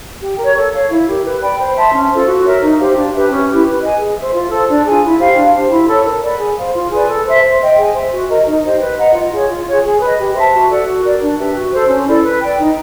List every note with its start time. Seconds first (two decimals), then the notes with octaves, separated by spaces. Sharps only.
0.22 G4
0.38 A#4 C#5
0.55 A4
0.72 C#5 F5
0.90 E4
1.07 G4 A#4
1.24 B4
1.41 D5 G5 B5
1.59 C5
1.75 E5 A5 C6
1.93 C#4
2.10 F4 A4 C5
2.27 F#4
2.45 A#4 C#5 E5
2.61 D#4
2.79 G4 C5 F5
2.96 D4
3.13 G4 B4 E5
3.30 C#4
3.47 E4 G4 B4
3.65 B4
3.82 D#5 G#5
3.99 G#4
4.17 C5 E5
4.33 F4
4.50 A4 C5
4.68 D4
4.84 F4 G#4
5.02 E4
5.19 G4 C5 F5
5.37 D4
5.54 G4 C5
5.71 E4
5.88 A4 C#5
6.05 A#4
6.22 D5 F#5 B5
6.40 G#4
6.57 C5 F5
6.74 F4
6.91 G#4 B4 D5
7.08 A4
7.25 C5 E5
7.42 C5
7.60 D#5 G5
7.77 G#4
7.94 C5 E5
8.11 F#4
8.28 A#4 D#5
8.46 D#4
8.63 G4 C5 D#5
8.80 B4
8.97 D#5 F#5 A#5
9.14 F4
9.32 G#4 C#5
9.49 F4
9.66 G#4 C#5 F#5
9.83 G#4
10.00 B4 D#5
10.17 G4
10.34 C5 E5 A5
10.52 F#4
10.69 A4 D5 F#5
10.87 F#4
11.03 A#4 D5
11.21 D4
11.38 G4 B4 E5
11.55 F#4
11.72 A4 C5
11.89 C#4
12.06 E4 A4 D5
12.23 B4
12.41 D5 G5
12.58 D#4